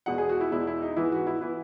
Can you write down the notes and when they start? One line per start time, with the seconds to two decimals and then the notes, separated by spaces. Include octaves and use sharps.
0.06 E2 B2 G#3 F#5
0.18 G#4
0.29 F#4
0.41 E4
0.51 E2 B2 G#3 E4
0.67 E4
0.82 D#4
0.96 G#2 E3 B3 E4
1.12 F#4
1.27 E4
1.41 E3 B3 E4